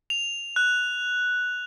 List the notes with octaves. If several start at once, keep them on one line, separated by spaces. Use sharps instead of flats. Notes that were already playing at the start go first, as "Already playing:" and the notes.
F7
F#6